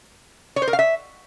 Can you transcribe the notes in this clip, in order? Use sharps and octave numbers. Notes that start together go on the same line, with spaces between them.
C#5
C5
A#4
F5
E5